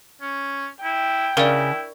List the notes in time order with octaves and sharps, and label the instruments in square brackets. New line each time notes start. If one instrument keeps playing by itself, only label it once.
[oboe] C#4
[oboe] E4 [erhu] G5
[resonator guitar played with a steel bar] C#3 [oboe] E4 [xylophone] A#4 D5